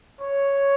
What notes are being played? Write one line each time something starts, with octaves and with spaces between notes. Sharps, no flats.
C#5